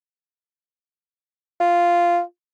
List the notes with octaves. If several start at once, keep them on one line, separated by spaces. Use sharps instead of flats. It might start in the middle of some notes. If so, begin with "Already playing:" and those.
F4